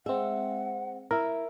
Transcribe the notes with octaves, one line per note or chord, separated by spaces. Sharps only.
G#3 C4 E5 F#5
E4 A#4 E5